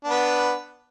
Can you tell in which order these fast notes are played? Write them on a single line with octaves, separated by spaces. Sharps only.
D4 B3 B4